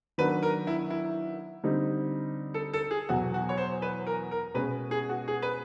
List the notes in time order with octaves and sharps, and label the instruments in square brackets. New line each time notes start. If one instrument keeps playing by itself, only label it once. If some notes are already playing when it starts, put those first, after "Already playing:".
[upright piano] D#3 F#3 B3 D4 F#4 [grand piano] B4
[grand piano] A#4
E4
E4
[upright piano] D3 G3 C4 D#4
[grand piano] A4
A4
G#4
[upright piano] E2 B2 F#3 [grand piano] F#4
[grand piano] F#4
C#5
C5
B4
A#4
A#4
[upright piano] B2 G#3 C#4 [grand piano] B4
[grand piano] G#4
F#4
G#4
B4